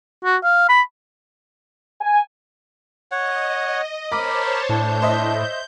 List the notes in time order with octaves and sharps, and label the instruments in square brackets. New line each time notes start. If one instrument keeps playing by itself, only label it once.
[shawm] F#4
F5
B5
[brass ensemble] G#5
[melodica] C#5 F#5 [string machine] D#5
[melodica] A#4 B5 [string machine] C5 C#5 A5 [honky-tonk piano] D6
[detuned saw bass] A2 [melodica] D4 [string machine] G6
[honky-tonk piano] C5 D#5 E5